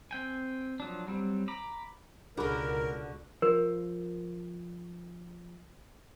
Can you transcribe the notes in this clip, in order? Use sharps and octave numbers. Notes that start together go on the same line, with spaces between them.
C4 G5 G#5
F3 F#3 D4
F#3 G3 C4
A#5 B5 D6
C#2 B2 D3 D4 F#4 G#4 A#4 B5
F3 A#4